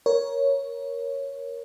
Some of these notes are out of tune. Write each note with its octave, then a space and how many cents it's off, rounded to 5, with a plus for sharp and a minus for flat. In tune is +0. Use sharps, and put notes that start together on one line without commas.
A#4 +15 C#5 +0